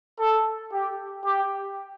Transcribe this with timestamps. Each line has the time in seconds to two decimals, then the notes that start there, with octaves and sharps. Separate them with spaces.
0.20 A4
0.72 G4
1.26 G4